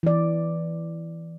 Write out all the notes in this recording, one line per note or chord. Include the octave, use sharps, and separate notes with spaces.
E3 D5